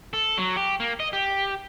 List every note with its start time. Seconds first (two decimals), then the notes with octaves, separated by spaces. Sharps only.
0.13 A4
0.38 F#3
0.56 G4
0.80 A#3
1.00 D#5
1.13 G4